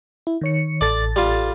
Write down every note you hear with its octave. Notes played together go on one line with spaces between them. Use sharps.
E4
D#3 C#5 C#7
A1 A4 D5 A6
G3 F4